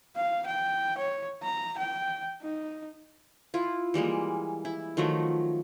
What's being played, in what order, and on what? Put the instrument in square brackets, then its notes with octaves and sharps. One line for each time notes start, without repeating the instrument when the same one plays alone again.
[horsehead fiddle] F5
G5
C#5
A#5
G5
D#4
[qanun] E4 F4
E3 G3 G#3 A#3
E4
D#3 F3 F#3 A3